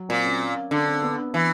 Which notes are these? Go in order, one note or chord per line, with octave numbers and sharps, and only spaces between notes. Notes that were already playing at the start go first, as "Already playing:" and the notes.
Already playing: F#3
A#2 C4
C#4
D3 D4
C4
B3
E3